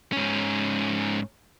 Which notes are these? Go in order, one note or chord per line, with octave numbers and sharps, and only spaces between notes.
G#2 C#4